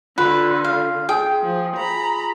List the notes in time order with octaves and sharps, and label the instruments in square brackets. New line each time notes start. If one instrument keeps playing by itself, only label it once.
[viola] D3 [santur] F4 [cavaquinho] B4
[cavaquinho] F5
[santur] G#4 [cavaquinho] G5
[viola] F3
A#5 B5